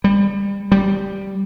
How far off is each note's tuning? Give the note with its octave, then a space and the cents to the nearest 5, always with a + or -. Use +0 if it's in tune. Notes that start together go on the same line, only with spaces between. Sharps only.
G3 +25
G3 -5